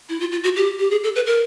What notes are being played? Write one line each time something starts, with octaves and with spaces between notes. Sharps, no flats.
E4
F4
F4
F#4
G4
G4
G#4
A4
B4
A#4